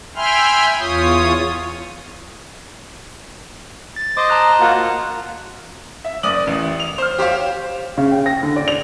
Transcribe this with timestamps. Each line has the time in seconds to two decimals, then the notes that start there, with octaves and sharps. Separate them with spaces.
0.16 E5 G5 G#5 B5 C6 F6
0.80 E2 F4 C#5 D#6
3.96 A6
4.17 C5 D#5 D6
4.30 A5 A#5 F#6
4.60 A#3 F4 F#4
6.04 E5
6.23 F#1 D5 D#6 F#7
6.47 A1
6.80 F7
6.98 C5 F6
7.18 G4 C5 C#5 F5
7.98 C#3
8.12 G5
8.26 A#6
8.43 D3
8.56 D5
8.68 F7